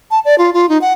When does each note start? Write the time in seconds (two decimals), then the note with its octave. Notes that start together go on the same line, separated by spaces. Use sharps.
0.11 A5
0.25 D5
0.38 F4
0.53 F4
0.69 D#4
0.81 F#5